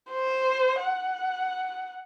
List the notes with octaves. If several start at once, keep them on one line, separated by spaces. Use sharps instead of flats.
C5
F#5